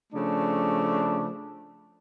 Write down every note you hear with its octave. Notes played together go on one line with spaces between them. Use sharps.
C#3 F3 A3 D4